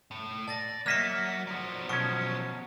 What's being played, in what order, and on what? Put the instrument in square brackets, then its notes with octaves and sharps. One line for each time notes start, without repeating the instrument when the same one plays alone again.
[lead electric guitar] A2
[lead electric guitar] D5 [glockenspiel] A5 A6 A#6
[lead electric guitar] F#3 [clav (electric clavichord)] A#3 D#5 E5 [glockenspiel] F6 B6 C#7
[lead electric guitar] F3 F#3 [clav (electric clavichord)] D5
[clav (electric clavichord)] B2 C#4 [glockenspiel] C#6